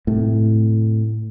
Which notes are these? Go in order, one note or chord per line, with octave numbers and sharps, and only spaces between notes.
A2 C3